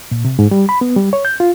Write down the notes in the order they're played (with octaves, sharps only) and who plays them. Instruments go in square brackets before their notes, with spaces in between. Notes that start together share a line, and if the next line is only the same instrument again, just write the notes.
[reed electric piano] A#2
C3
G#2
G3
B5
B3
G3
C#5
G6
F4